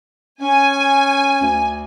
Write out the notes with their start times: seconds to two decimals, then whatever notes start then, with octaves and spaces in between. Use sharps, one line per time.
0.41 C#4 G#5
1.42 D2